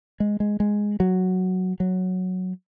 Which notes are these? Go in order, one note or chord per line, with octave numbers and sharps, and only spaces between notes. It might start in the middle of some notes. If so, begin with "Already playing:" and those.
G#3
G#3
G#3
F#3
F#3